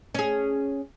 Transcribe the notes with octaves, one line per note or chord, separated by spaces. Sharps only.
C#4 G#4